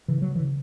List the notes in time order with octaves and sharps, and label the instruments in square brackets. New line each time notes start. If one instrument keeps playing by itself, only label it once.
[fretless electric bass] C#3 E3
F#3
E3
C#3